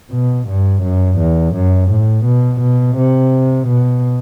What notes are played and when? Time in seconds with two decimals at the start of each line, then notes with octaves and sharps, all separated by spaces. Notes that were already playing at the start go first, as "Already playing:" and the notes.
0.12 B2
0.49 G2
0.83 F#2
1.19 E2
1.55 F#2
1.91 A2
2.26 B2
2.61 B2
2.97 C3
3.68 B2